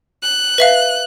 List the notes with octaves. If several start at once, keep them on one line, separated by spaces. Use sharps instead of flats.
F#6
B4 E5 F5